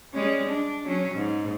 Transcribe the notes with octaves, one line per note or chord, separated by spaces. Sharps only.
G3 G#3 C#4
D4
F#3 C#4
G#2